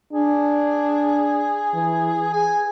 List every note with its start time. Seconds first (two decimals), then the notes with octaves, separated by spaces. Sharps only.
0.13 D4 G#4
1.73 E3
2.33 G#4 G#5